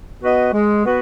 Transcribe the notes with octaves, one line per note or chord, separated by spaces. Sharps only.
B3 F#4 B4 D#5
G#3
B3 F#4 B4